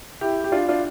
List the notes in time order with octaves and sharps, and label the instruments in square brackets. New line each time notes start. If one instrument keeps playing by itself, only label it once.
[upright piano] E4 G4
G4
D4 F4
D4 F4